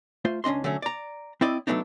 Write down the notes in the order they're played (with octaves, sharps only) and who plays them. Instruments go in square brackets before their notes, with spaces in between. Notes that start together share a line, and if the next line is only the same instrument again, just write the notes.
[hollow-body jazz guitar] A3 F4 C5
C#2 C#4 D4 D#5 C6
D3 F#3 A3 C#4
D5 A#5
C4 E4 D5 D#5
F#3 G#3 A3 B3 D4 D#4